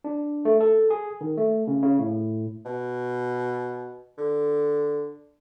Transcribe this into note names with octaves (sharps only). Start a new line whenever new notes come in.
D4
A3
A4
G#4
D#3
A3
C#3
C#3
A2
B2
D3